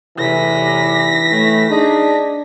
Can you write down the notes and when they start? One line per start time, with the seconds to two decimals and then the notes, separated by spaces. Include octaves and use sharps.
0.18 E2 A2 C3 E3 A#6 B6
1.32 A2 A3
1.70 D4 D#4 G#4